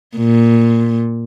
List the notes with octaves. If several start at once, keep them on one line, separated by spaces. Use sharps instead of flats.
A#2